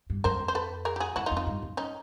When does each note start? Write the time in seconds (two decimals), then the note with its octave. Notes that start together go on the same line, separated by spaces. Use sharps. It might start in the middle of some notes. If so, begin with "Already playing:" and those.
0.10 G2
0.24 F#2 A#4 C5
0.40 F2
0.48 C5
0.55 A4 B4
0.85 G#4 A#4
0.96 G4
1.00 F#4 G#4
1.16 F#2 E4 F#4
1.26 D#4 F4
1.31 F2
1.37 D#4 F4
1.47 G2
1.62 F#2
1.77 C#4 D#4